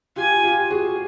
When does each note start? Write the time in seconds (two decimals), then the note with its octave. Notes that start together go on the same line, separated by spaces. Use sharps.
0.16 F4 G4 G#5
0.43 F4 G4
0.71 F#4 G#4